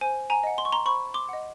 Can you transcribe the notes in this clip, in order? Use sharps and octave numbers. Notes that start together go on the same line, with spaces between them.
C5 G#5
G#5 A#5
D#5 F#5
C6
C#6
A#5 C6
C5 B5 C#6
C6 D6
D#5 F#5